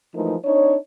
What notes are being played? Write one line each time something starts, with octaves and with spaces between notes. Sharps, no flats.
E3 F3 G#3 A3 D#4 A#4
C4 D4 D#4 C#5